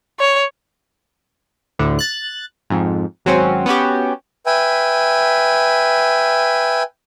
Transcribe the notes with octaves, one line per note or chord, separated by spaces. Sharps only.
C#5
D2 A2 D3
F#6 A6
F2 G#2
G#1 F#3 C4 C#4
B3 C#4 F#4 G4
B4 E5 G5 G#5